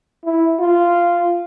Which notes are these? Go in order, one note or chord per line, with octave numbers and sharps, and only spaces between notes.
E4
F4